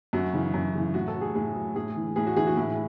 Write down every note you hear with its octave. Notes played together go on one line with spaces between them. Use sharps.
F#2 F#4
C#3 E3
F#2
C#3 E3
A2 F#4
A4
F#3
G#4
A2 G#4
F#3
A2 G#4
E3
A2 G#4
F#4
E3 G#4
F#4
A2 E4